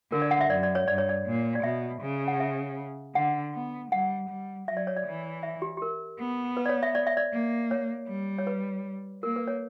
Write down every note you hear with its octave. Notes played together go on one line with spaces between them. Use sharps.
D3 A#4
D5
F#5
E5
F#2 D5
D5
C#5
G2 D5
C#5
D5
A#2
D5
B2 E5
C#3
F#5
E5
D3 F#5
B3
G3 F#5
G3
F#3 E5
D5
C#5
D5
E3
E5
G4
G4
A#4
B3
B4
D5
C#5
E5
D5
E5
D5
A#3
C#5
G3
C#5
B4
A#3 A#4
B4
C#5